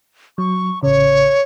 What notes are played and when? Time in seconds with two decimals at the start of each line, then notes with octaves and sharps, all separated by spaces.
0.38 F#3 C#6
0.83 A1 C#3 C#5